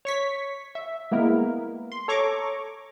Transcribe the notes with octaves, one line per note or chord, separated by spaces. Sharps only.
C#5 C#6 B6
E5
G#3 A#3 B3 E4 A#4
C6
A4 C#5 A#5 C#6 D6